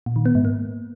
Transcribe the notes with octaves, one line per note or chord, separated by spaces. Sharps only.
A#2
D#3
B3
G#2
A#3